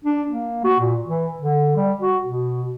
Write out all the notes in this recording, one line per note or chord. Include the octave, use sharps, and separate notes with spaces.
D4
A#3
F#4
A#2
E3
D3
G3
F#4
B2